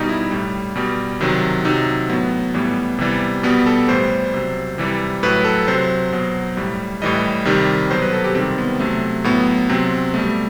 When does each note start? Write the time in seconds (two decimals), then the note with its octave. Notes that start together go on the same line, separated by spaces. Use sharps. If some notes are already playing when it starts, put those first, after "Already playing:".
Already playing: B2 G3 D#4
0.09 E4
0.31 A2 G3
0.76 B2 G3
1.21 C3 D#3 F#3
1.65 C3 F#3 D#4
2.10 A2 F#3 B3
2.54 A2 E3 G3 B3
2.99 C3 E3 G3
3.43 B2 G3 B3
3.66 A4
3.88 A2 E3 G3 C5
4.34 C3 F#3
4.78 C3 E3 G3
5.23 A2 F#3 B4
5.45 A4
5.67 C3 F#3 C5
6.13 B2 F#3
6.57 A2 G3
7.02 A2 E3 G3 D#5
7.45 C3 D#3 G3
7.91 B2 F#3 C5
8.02 B4
8.13 A4
8.24 G4
8.35 C3 D#3 G3 C4
8.58 B3
8.79 C3 F#3 A3
9.24 A2 F#3 B3
9.69 C3 F#3 C4
10.14 B2 G3 A3